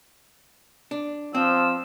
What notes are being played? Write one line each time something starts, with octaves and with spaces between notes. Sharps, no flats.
D4
F3 C4 E6